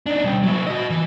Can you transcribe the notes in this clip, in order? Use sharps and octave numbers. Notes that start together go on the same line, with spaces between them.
D4 D#4
B2 G3
F#3 E4
F#4 D#5
E3